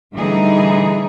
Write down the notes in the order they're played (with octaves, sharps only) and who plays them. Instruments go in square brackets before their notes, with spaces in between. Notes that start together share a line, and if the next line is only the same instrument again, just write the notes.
[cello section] A2 D3 E3 G3 D#4 G#4